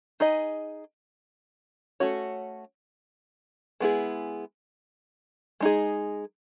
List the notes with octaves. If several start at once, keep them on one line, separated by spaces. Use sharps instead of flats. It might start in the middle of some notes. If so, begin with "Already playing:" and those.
D#4 G#4 D#5
A3 C#4 F#4 C#5
G#3 B3 E4 G#4
G#3 D#4 G#4